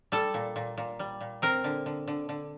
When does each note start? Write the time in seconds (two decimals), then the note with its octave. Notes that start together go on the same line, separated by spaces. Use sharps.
0.12 G3 A4
0.34 A#2
0.56 A#2
0.78 A#2
0.99 G3
1.21 A#2
1.42 C4 A#4
1.64 D3
1.86 D3
2.08 D3
2.29 D3